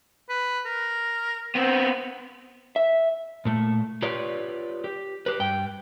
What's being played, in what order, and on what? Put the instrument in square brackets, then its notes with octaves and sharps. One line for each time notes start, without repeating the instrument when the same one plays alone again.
[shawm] B4
A#4
[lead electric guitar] B3 C4
[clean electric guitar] E5
[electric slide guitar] A#2 A3
F4 G4 B4 C#5 D5
G4
G4 B4
G2 G5